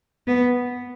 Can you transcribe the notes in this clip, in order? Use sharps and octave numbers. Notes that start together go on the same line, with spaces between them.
B3